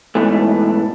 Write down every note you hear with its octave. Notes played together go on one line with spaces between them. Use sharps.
G#2 B2 E3 A3